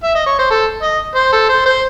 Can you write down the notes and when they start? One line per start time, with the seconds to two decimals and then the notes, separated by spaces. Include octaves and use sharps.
0.03 E5
0.15 D#5
0.26 C#5
0.39 C5
0.51 A4
0.83 D#5
1.16 C5
1.32 A4
1.49 C5
1.66 C5